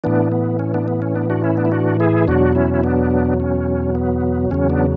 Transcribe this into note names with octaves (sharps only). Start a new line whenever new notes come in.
A2 E3 B3 D4
B3
C#4
B3 D4
B3
C#4
B3 D4
D4 F#4
C#4 E4
B3 D4
E4
D4 F#4
E4 G#4
E2 B2 F#3 D4 F#4
C#4 E4
E4
B3 D4
C#4
B3
E2 C#3 F#3 C#4
B3 D4